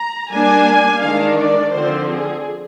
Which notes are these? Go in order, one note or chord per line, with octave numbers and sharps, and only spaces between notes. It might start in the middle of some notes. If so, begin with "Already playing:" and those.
Already playing: A#5
G3 A#3 D4 G#5
D#3 G#3 D4 F5
D5
D3 F3 C4 C5
G#4